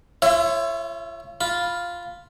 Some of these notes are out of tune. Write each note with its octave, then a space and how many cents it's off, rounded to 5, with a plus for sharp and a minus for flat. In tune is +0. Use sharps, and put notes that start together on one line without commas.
F4 -35 C#5 -15 E5 +20
F4 +0 B5 +0